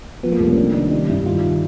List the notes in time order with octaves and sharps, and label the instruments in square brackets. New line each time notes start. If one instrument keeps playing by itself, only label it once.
[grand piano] F3 [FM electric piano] B3
[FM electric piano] A#3
[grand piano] C2 [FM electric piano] A3
[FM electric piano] C#4
[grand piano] C4 [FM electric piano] D4
[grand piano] D#3 [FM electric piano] D4
[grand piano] G3 [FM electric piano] D#4
[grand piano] G2 [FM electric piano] E4
[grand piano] D#3 [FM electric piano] F4